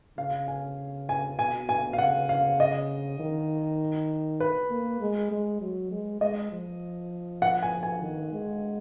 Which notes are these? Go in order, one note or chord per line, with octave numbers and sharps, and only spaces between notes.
C#3 F5
G#5
G#5
B2 G#5
G#5
F5
C#3 F#5
F5
D#5
D#3
B4
A#3
G#3
G#3
F#3
G#3
G#3 D#5
F3
F#5
G#5
G#5
D#3
G#3